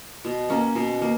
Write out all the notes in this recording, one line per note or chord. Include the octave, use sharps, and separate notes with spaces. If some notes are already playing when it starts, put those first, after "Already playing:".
B2
A#3 C#4
B2
A#3